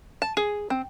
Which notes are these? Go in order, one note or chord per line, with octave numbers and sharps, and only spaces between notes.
A5
G#4
C4